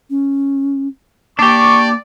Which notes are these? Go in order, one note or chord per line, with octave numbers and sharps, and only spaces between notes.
C#4
A#3 D4 G4 D5 C#6